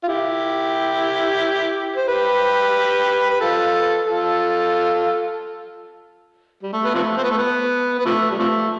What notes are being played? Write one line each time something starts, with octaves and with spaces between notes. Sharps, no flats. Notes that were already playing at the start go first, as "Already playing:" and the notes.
F4
E4 G4
C5
G4 B4
B4
F4 A4
F4 A4
G3
A3
B3
C3 F3 A3
C4
B3
A3
B3
B3
C3 F3 A3
G3
C3 F3 A3